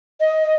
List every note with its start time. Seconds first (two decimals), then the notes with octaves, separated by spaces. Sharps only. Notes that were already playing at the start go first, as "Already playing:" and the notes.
0.21 D#5